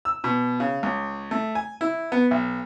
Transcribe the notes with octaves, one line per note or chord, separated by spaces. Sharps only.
E6
B2
C#3
C#2
A3
G#5
E4
B3
B1